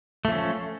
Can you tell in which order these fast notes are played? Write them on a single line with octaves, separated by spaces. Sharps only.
A3 F3 C#4